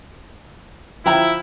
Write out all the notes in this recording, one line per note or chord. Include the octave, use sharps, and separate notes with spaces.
F3 E4 G5 A#5